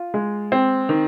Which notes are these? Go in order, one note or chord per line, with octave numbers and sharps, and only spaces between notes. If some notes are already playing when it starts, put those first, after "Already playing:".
Already playing: F4
G#3
C4
D#3